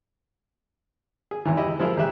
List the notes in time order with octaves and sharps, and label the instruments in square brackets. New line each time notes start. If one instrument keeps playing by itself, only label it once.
[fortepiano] G#4
G#1 E2 G#2 E3
E4 G4 D#5
F3 G#3 E4 A#4
A1 G4 G#4 E5 F#6